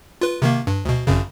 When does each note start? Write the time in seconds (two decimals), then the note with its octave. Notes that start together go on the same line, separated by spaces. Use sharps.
0.21 F4 B4
0.42 C3 D#3 A#3
0.67 G2
0.85 D2 B2
1.07 G#1 F#2 C#3